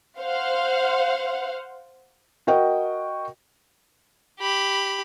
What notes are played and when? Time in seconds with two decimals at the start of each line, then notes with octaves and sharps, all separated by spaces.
0.19 C5 F5 F#5
2.47 F#4 A#4 D#5 G5
4.40 G4 B5